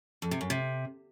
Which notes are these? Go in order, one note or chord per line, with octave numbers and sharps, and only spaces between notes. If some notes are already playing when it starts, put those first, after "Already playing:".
F2
C3
F#2
C3